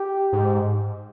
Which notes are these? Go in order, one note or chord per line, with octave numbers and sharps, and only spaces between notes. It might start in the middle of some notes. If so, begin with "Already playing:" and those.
Already playing: G4
G#2